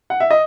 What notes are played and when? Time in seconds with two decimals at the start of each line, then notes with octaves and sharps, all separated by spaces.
0.10 F#5
0.20 E5
0.31 D#5